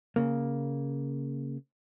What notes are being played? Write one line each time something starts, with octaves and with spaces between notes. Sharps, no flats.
C#3 A#3